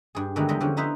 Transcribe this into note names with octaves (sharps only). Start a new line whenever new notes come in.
G2 G#4
D3 D#3 F#3 G#3 A3 B3
E2 G3 G#3 D#5
D3 F3 C#4
B3 D#4 E4 B4 C5